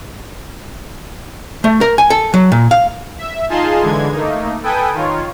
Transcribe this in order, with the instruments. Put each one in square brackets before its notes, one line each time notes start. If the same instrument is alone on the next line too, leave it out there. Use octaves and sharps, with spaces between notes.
[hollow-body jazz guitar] A3
A#4
G#5
A4
F#3
A#2
F5
[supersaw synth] E5
D#4 F4 G#4 F5 A5 C6
D3 E3 G#3 G#6
A3 A#3 D#4
A4 B4 G5 G#5 D#6
D#3 F4 C#5